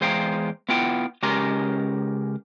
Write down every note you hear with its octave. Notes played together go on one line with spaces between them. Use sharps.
E2 G#3 C5 F5 G5 A#5
B3 E4 F4 F#5 G5
C#2 C#4 G4 A#4 A#5 C6